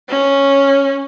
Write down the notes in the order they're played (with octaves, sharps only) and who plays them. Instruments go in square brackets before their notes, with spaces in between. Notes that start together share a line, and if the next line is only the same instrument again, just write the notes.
[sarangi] C#4